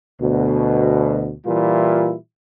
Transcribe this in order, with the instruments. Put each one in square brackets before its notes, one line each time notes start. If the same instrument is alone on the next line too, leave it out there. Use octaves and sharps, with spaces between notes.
[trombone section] D2 B2
A#2 E3 G3 E4 F4